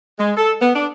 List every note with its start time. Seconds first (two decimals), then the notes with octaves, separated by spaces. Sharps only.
0.19 G#3
0.36 A4
0.61 B3
0.75 D4